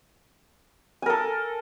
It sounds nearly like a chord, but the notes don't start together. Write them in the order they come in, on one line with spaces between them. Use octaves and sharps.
G#5 A#4 A4